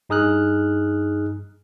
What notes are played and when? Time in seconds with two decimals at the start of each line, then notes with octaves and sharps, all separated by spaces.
0.09 G2 D#4 G#4 D#6 F6 F#6